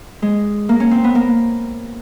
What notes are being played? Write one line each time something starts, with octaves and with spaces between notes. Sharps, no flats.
G#3
A#3
C#4
C4
B3
A#3